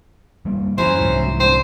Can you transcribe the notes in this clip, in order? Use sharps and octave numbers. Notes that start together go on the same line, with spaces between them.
F#1 G3 A#3
F#2 E3 F#3 C#4 C5
C2 G#2
C4 D4 C5